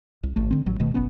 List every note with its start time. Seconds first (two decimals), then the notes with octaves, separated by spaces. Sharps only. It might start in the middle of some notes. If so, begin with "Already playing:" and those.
0.23 C2
0.36 G#1 A3
0.51 D3 C4
0.66 A1 F#3
0.80 D1 B2 D#3 A3
0.94 F#1 B1 B3 C#4